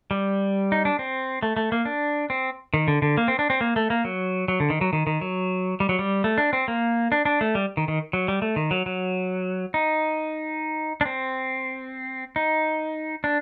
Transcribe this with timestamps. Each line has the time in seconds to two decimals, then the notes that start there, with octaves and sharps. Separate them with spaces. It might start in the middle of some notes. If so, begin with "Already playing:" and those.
0.11 G3
0.72 D#4
0.85 D4
0.99 C4
1.43 A3
1.57 A3
1.72 A#3
1.85 D4
2.30 C4
2.74 D#3
2.88 D3
3.02 D3
3.17 A#3
3.28 C4
3.39 D4
3.50 C4
3.61 A#3
3.76 A3
3.90 A#3
4.05 F#3
4.48 F#3
4.60 D3
4.70 D#3
4.81 F#3
4.93 D#3
5.07 D#3
5.21 F#3
5.80 G3
5.89 F#3
5.99 G3
6.24 A3
6.38 D4
6.53 C4
6.68 A#3
7.12 D4
7.25 D4
7.41 A3
7.55 G3
7.77 D#3
7.88 D#3
8.13 F#3
8.28 G3
8.42 A3
8.56 D#3
8.71 F#3
8.86 F#3
9.74 D#4
11.01 D4
11.05 C4
12.36 D#4
13.24 D4